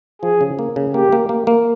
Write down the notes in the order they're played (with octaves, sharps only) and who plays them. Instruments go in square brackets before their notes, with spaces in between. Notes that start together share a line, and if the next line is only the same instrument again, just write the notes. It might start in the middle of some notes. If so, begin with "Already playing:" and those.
[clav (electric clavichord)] F3 [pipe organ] G#4
[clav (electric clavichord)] C#3
A#3
C#3
[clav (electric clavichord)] A#3 [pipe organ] G4
[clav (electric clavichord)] A#3
A#3
A#3